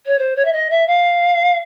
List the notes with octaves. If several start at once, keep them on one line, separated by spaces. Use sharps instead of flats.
C#5
C5
C#5
E5
D#5
E5
F5